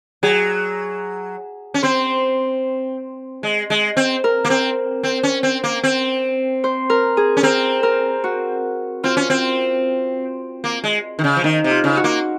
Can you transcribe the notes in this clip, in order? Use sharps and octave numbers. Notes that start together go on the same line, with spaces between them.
F#3 G#4
C#4
C4 C5
G#3
G#3
C4
A#4
A#3
C4
C4
C#4
C4
A#3
C4
C5
A#4
G#4
C#4
C4 A#4
A#4
F#4
C4 F4
C#4
C4
A#3
G#3
D#3
C#3
F3
D#3 D#4
C3
F4
C#3
F#4
A#3